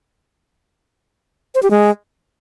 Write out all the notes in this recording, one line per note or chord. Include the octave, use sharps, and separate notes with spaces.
C5
G4
G#3